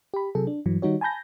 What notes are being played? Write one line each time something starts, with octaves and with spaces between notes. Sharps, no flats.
G4 B5
C3 F#3 G#4 A4
D4
G2 E3 F#3
D#3 G3 D#4 F#4 C#5
G#5 A5 B5 G6 A#6